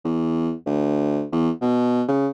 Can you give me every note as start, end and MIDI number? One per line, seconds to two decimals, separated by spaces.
0.05 0.52 40
0.66 1.24 38
1.32 1.50 40
1.62 2.03 47
2.08 2.29 49